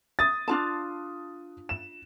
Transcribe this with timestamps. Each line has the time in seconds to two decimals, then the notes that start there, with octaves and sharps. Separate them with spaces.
0.19 D#6 A6
0.48 D4 F4 A5
1.69 E7